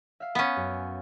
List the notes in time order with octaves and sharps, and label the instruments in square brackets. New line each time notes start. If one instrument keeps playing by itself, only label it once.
[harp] E5 F5
[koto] B3 C#4
[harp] F#2